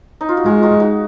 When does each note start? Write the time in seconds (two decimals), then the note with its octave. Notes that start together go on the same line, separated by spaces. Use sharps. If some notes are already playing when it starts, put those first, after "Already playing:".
0.21 D#4
0.29 F4
0.37 F#4
0.46 G#3 F4 G#4
0.63 D#4 F#4
0.80 D#4 F#4